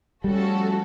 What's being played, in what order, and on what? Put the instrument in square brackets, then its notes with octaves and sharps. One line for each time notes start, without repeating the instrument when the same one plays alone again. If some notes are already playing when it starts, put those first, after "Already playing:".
[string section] F3 A3 C#4 F#4 A4 [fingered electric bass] G3